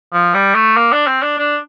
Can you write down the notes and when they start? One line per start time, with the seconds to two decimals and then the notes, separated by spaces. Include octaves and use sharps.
0.13 F3
0.34 G3
0.54 A3
0.76 A#3
0.92 D4
1.07 C4
1.22 D4
1.38 D4